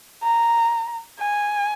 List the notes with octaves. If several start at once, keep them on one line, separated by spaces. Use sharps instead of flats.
A#5
G#5